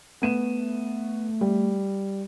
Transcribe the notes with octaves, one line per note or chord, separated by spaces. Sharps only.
A3 B3 D#7 E7
G3